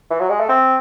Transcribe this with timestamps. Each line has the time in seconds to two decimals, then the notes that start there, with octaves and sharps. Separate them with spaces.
0.10 E3
0.20 F#3
0.29 G#3
0.40 A3
0.49 C4